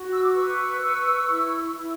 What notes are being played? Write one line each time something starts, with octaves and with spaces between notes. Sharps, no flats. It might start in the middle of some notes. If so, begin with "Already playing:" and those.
Already playing: F#4
E6
D6
B4 C#6 E6
B4
E4
E4